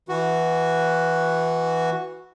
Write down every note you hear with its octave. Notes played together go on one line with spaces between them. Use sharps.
E3 F#4